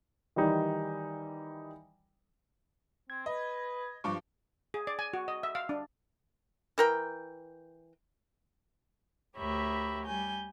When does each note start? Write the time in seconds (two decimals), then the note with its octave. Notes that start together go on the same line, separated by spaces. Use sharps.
0.36 D#3 E3 G3 D#4 D5
3.10 C4 G#6
3.26 B4 D#5
4.04 G2 F3 G3 C#6 D6
4.74 G#4
4.87 D5
4.99 G#5
5.13 F#4
5.28 D#5
5.43 E5
5.55 F5
5.69 D4
6.78 E3 A#4 G5
9.37 D2 G4 A#4 C#5 E5 B5
10.05 G3 G#5 G6